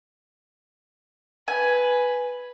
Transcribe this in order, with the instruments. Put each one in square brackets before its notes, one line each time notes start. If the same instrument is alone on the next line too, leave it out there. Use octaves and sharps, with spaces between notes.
[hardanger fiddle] B4 [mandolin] G#5